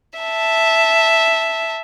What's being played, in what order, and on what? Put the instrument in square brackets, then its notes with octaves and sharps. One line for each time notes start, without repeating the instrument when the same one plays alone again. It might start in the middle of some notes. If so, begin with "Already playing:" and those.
[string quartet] E5 A5